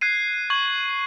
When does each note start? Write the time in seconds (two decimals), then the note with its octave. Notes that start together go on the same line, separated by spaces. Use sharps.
0.01 F#6 G#6 C7 D#7
0.50 C#6 G#6 F#7